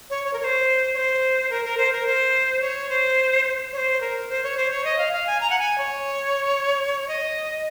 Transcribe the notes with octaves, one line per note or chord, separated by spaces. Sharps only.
C#5
C#5
A#4
C#5
C5
C#5
C5
A#4
A#4
C5
A#4
C5
C#5
C5
C#5
C5
A#4
C5
C#5
C5
C#5
D#5
F5
F5
G#5
A#5
F#5
G#5
C#5
D#5